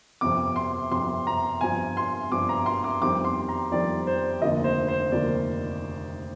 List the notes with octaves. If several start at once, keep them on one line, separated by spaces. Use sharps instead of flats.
G1 F2 C3 D6
C6
G1 F2 C3 C6
A#5
G1 G2 F3 G#5
C6
G1 G2 F3 D6
A#5
C6
D6
G1 F2 D#3 G3 C4 D6
C6
A#5
G1 F2 D#3 G3 C4 D5
C5
F1 D#2 D3 F3 A#3 D#5
C5
C5
F1 D#2 D3 F3 A#3 D5